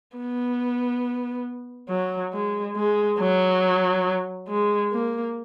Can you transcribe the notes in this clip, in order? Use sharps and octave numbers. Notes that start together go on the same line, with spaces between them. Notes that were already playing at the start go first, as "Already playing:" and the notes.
B3
F#3
G#3
G#3
F#3
G#3
A#3